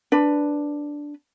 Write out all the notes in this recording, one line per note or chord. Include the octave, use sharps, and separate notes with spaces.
D4 B4